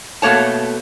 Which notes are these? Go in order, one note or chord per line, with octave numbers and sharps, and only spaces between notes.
B2 A3 A#3 C#5 A5